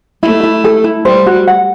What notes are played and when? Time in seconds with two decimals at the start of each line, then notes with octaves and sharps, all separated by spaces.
0.22 A3 E4
0.43 E4
0.64 A4
0.84 E4
1.05 G3 C5
1.26 F#4
1.47 F#5